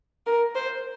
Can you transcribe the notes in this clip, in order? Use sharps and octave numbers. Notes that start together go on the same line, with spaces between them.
A#4
C5